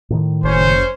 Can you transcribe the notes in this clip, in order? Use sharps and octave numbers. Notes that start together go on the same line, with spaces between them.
A2 D#3
F#1 C#4 C5